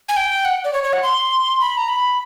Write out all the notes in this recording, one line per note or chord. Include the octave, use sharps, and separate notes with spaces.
G#5
G5
F#5
D5
C#5
C#5
F#5
C6
B5
A#5
B5